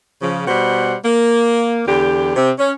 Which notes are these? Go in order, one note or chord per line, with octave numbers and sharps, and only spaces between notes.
C#3 F3
B2 G3 C5 F#5
A#3
E2 D3 G4
C3 C4
C#4